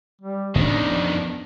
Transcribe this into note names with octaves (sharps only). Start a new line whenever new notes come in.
G3
B1 F2 A2 D#3 C#4 D4 A#6
F3 B3